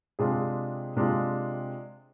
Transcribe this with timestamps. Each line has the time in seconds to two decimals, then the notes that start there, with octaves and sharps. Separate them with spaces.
0.19 C3 G#3 D4 F4 G#4
0.96 C3 G#3 D4 F4